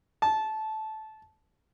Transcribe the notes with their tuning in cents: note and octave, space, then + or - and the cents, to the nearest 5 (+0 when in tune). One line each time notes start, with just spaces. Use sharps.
A5 -15